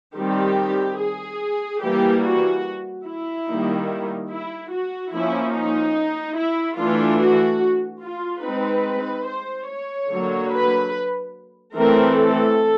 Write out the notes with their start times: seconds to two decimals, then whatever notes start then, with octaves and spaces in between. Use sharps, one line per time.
0.16 D#3 G3 C4 G4
0.99 G#4
1.81 E3 G3 A#3 G4
2.23 F#4
3.06 E4
3.47 D#3 G3 A#3 D#4
4.30 E4
4.71 F#4
5.12 F3 A#3 C#4 E4
5.53 D#4
6.37 E4
6.78 E3 A3 D4 F4
7.20 F#4
8.02 F4
8.43 G#3 C4 D#4 B4
9.27 C5
9.67 C#5
10.09 D3 F#3 A#3
10.50 B4
11.74 E3 A3 C4 A#4
12.16 A4